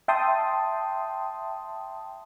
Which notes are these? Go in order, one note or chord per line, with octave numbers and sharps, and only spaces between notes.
E5 G5 A5 C6 D#6